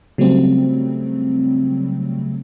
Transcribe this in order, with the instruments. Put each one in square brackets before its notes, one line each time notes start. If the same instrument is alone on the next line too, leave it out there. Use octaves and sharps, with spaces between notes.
[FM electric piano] C#3 F#3 G3 A3 C4